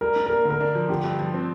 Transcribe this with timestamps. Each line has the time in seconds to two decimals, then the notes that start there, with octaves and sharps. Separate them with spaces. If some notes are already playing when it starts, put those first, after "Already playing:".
0.01 G3 A#4
0.16 D4
0.26 A#3 A#4
0.45 D3
0.50 A#4
0.60 D4
0.75 F3
0.89 D3 G4
1.04 G2
1.19 F3
1.34 C4